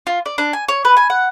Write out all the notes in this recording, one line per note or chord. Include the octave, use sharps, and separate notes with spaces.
F4
D5
D4
G#5
C#5
B4
G#5
F#5